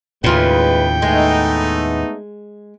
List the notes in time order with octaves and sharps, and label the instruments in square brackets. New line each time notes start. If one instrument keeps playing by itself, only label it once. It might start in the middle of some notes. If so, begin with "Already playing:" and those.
[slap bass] D#2 A2 [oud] C#3 F4 [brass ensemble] G#3 A3 B4 [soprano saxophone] G5
[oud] G#3 [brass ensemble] A3 B3 D#4